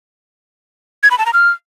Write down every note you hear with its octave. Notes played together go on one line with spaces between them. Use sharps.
G#6
B5
A5
A#5
F6